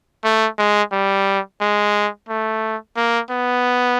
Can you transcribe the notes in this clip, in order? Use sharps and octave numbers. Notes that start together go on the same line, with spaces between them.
A3
G#3
G3
G#3
A3
A#3
B3